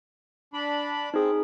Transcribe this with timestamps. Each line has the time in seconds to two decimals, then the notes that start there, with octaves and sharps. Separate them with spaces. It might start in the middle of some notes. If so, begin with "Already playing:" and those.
0.54 D4 B5
1.14 C4 D#4 G#4